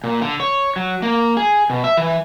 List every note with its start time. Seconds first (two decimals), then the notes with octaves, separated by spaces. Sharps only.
0.04 A#2
0.22 D3
0.40 C#5
0.76 F#3
1.02 A#3
1.37 G#4
1.70 B2
1.84 E5
1.97 E3